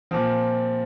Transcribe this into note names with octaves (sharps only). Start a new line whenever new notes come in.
A#2 F3 C4